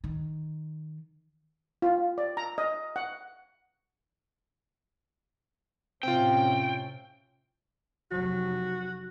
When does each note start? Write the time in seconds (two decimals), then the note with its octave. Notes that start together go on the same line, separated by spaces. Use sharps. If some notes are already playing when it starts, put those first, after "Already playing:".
0.04 D#3
1.82 F4
2.18 D5
2.37 A#5
2.58 D#5
2.96 F#5
6.03 A2 C3 C4 C#4 F4 G5
8.11 F1 F#3 F#4